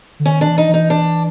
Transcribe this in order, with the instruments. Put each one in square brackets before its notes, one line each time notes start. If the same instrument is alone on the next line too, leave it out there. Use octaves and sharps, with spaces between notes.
[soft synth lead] D3
[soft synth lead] D#3 [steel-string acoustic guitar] C#4
[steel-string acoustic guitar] D4
[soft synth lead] E3
[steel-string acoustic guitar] D#4
[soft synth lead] E3
[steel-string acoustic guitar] D#4
D4